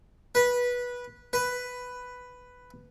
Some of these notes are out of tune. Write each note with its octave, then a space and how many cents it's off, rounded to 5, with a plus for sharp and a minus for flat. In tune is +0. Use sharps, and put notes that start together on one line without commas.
B4 -15
B4 +5